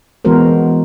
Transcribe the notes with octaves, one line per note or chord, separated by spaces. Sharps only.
E3 G#3 B3 F#4 A#4 C5